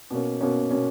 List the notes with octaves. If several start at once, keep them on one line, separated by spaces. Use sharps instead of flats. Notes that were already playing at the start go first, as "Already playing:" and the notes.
B2 A#3 C#4
B2 A#3 C#4
B2 A#3 C#4